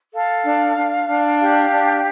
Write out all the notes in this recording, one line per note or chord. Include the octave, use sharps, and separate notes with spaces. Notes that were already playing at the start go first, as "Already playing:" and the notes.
A4 F5
D4
D4
D4
G4 F5
D4